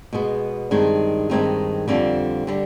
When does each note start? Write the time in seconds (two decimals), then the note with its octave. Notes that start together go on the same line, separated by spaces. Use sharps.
0.13 B2 G#3 B3
0.71 G2 D#3 G#3 C4 D#4
1.30 G2 D#3 G#3 C4 D#4
1.88 F2 D3 G3 C4
2.47 D3 G3